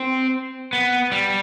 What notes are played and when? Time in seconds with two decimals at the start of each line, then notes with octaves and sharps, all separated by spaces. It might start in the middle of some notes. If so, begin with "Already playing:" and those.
Already playing: C4
0.73 B3
1.12 G3